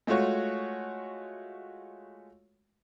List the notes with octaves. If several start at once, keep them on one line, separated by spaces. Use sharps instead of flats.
G#3 A3 F4 F#4 C#5